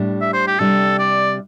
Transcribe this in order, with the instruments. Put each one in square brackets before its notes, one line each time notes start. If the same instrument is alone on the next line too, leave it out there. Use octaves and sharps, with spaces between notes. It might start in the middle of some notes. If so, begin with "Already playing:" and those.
Already playing: [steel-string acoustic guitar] A2 G3 D4
[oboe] E5
C5
G4
[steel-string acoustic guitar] C3 G3 D4 [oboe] A4
[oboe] D5